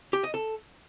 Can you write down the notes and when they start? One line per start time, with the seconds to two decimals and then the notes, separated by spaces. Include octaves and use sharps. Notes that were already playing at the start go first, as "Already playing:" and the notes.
0.13 G4
0.23 D#5
0.34 A4